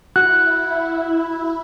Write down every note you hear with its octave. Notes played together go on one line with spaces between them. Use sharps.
E4 F#4 F#6